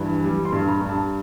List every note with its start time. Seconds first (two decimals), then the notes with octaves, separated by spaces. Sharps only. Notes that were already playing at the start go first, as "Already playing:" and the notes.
Already playing: G2 E3
0.24 G3
0.45 C6
0.52 G2
0.68 A#5
0.82 G2
0.89 A5